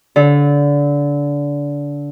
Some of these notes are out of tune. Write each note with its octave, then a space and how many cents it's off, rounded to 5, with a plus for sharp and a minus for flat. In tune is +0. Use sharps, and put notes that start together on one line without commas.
D3 -25